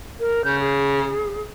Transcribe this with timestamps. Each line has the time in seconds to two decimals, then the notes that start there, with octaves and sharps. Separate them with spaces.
0.20 A#4
0.44 C#3 G6
0.59 G#4